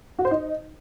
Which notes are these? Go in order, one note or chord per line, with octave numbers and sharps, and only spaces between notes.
F#4
C5
D#4